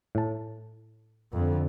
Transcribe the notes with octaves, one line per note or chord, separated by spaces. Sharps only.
A2 A5
F2 D3